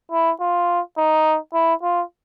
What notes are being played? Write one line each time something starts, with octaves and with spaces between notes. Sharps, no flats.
E4
F4
D#4
E4
F4